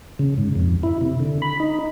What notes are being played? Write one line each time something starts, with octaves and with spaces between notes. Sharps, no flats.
C#3
G#2
F2
E4
C3
D3
B5
D#4